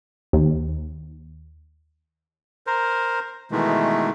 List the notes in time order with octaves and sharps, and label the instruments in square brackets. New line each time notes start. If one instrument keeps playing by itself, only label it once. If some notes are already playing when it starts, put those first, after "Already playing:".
[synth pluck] D#2
[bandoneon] A#4 C5
B2 D#3 E3 G#3 A3